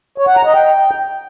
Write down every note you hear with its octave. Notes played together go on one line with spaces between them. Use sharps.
C#5
F#5
A#5
D#5
G5